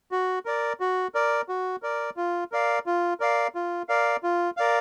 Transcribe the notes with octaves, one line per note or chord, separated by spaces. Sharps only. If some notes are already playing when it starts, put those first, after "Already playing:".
F#4
A#4 D5
F#4
A#4 D5
F#4
A#4 D5
F4
A#4 D5 F5
F4
A#4 D5 F5
F4
A#4 D5 F5
F4
A#4 D5 F5